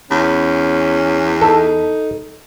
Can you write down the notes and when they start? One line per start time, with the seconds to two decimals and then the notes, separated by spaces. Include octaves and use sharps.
0.11 E2 C#4
1.41 D#4 A4